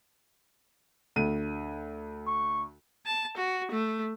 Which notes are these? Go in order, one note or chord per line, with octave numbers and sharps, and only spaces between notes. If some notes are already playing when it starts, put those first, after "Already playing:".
D2 D#7
C#6
A5
F#4
A3